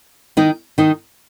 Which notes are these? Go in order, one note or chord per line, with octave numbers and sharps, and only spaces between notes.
D#3 D#4
D#3 D#4